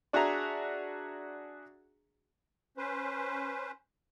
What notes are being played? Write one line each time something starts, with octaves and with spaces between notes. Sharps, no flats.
D4 F#4 G#4 E5 A#5
C#4 B4 C5